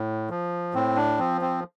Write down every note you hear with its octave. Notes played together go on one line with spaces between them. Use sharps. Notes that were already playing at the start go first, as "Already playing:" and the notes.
Already playing: A2
F3
A2 C4
D4
F3 C4
C4